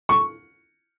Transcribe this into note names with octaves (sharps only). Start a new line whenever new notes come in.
C#6